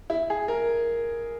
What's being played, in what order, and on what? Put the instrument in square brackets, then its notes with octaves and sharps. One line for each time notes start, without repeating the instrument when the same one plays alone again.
[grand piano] E4
G#4
A#4